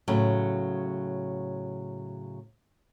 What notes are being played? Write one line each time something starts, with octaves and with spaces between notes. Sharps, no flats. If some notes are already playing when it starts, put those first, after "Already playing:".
A2 C#3 F#3